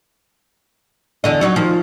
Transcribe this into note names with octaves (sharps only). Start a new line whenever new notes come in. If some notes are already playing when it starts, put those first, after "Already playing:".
E2 D3 D#5
F#3 D#4 F#4
D#3 F3